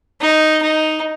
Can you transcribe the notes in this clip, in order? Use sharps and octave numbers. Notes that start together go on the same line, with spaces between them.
D#4
D#4